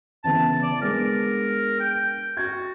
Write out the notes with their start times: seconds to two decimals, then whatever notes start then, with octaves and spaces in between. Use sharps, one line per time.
0.24 C#3 E3 B3 A5
0.63 D5
0.82 G#3 B3 D4 A#4
1.80 G5
2.37 F#4 G#6 A6